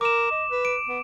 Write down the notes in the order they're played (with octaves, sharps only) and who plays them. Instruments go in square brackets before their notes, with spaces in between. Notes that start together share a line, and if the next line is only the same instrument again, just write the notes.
[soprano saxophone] A#4 [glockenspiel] D6 E7
[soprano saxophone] D#5
B4
[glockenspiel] D7
[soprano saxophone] B3